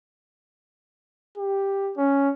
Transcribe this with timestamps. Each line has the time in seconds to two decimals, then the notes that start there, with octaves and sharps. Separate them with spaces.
1.38 G4
1.97 C#4